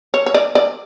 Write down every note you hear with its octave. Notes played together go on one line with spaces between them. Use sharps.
C#5
C#5
D5
D5